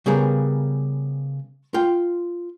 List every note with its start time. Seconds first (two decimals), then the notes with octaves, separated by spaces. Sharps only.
0.06 C#3 G3 B3 G#4 A#4
1.74 F4 G5